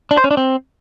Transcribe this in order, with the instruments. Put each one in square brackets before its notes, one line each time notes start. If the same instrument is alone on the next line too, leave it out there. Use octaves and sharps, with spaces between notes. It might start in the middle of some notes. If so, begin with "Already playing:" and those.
[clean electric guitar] D4
C5
C#4
D4
C4